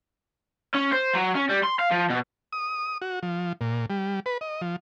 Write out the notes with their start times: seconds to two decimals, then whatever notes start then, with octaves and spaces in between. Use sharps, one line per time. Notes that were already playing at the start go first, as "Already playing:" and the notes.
0.75 C#4
0.93 C5
1.15 F#3
1.35 C#4
1.49 G3
1.63 C6
1.79 F5
1.91 F3
2.10 B2
2.53 D#6
3.02 F#4
3.23 F3
3.61 A#2
3.90 G3
4.26 B4
4.41 D#5
4.61 F3